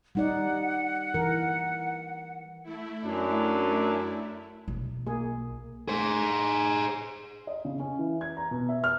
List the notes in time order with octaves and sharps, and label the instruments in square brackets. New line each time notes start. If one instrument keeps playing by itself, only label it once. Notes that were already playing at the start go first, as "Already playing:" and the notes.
[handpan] G3 D#4 D5 [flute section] F#5
[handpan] E3 A#4
[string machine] A3 E4
[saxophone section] F#2 [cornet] D4
[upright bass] B1
[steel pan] A#3 G#4
[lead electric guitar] G#4 C5
[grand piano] D#5
C#3
C#4
E3
G#6
A#5
B2
E5
F6